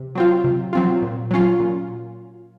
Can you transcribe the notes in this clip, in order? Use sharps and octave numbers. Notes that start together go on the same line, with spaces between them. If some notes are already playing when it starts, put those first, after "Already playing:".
Already playing: C3
F#3 C4 F4
C3
F#3 C4 F4
A#2
F#3 C#4 F4
A#2